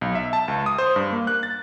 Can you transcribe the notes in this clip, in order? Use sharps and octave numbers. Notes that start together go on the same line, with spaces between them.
B1
E5
A5
C#2
D#6
C5
G2
A#3
F#6
A6